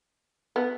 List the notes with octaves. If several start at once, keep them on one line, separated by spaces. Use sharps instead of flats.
B3